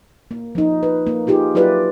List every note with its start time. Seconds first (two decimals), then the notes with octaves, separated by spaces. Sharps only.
0.31 A#3
0.55 F3 D#4
0.83 B4
1.07 A#3
1.27 D#4 F4 G4 G#4
1.55 F#3 E4 F4 G4 B4 D5